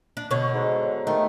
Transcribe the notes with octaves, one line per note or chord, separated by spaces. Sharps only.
D4
B2 D3 C#5
G#2
D#3 A3